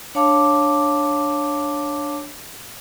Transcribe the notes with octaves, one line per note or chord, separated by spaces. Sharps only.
D4 C#5 F5 A5 D6